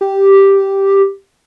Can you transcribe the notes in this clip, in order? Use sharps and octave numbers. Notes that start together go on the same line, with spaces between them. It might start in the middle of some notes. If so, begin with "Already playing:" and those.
G4